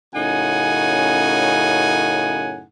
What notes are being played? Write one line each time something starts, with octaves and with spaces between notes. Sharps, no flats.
F#2 A2 C#3 D#4 F#5 G#5